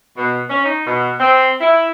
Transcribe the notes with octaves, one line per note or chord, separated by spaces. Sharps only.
B2
C#4
D#4
B2
C4
E4